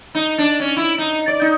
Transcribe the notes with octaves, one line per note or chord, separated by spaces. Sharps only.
D#4
D4
C#4
E4
D#4
D5
D#4